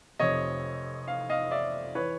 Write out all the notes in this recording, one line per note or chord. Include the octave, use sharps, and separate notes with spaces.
F1 F2 C3 C#5 D#5
F5
D#5 F5
D5 E5
E3 B4 C#5